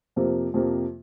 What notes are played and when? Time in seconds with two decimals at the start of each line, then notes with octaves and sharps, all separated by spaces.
0.16 F2 C3 F3 A#3
0.54 F2 C3 F3 A#3